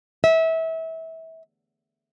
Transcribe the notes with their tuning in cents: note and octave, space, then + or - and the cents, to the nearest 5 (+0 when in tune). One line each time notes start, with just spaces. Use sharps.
E5 -25